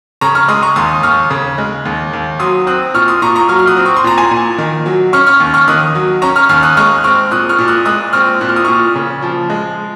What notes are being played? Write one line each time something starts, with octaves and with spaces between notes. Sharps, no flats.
C#3 A#5 C#6
C#6 F6
G#3 C6 D#6
A#5 C#6
D#2 C6 D#6
D#2 C#6 F6
C#3
G#3
D#2
D#2
F#3 C6 D#6
C4 D#6 F#6
A#2 C#6 F6
C6 D#6
A#2 A#5 C#6
A#5 C#6
F#3 C#6 F6
F6
D#6 F#6
C4
C#6
C6
A#2 A#5
G#5 C6
A#2
D#3
F#3
C#4 C#6 F6
C#6 F6
D#2
C#6 F6
D#3 D#6 F#6
F#3
C#4 A#5 C#6
C#6 F6
D#2 C#6 F6
D#6 F#6
G#3 C#6 F6
C4 C#6 F6
A#2 D#6 F#6
C#6 F6
A#2
D#6 F#6
G#3 D#6 F#6
C4 C#6 F6
A#2 F#6
F6
D#6
A#2 C#6 F6
C#3
F3
G#3